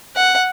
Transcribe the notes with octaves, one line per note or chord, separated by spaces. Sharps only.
F#5